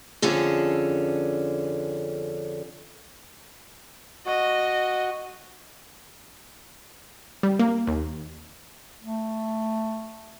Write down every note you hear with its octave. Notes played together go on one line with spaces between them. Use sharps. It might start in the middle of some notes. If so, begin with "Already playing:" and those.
F2 D3 C#4 G#4 A4
F#4 D#5
G3
A#3
D#2
A3